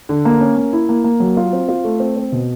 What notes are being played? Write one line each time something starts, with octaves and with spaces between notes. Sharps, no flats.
D3
A#3
C#4
A#3
E4
A#3
A#3
F#3
F4
C4
F4
A3
C4
C4
B2